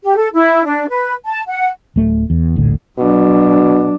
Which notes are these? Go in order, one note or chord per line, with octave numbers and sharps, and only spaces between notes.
G4
A4
E4
D4
B4
A5
F#5
D1 A3
E2
D#1 A#1 A2 D3
B2 F#3 D4